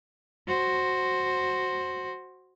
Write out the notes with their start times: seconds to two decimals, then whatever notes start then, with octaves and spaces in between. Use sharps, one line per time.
0.47 F#4 C5